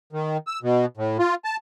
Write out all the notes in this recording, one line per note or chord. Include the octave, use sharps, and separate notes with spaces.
D#3
E6
B2
A2
F4
A5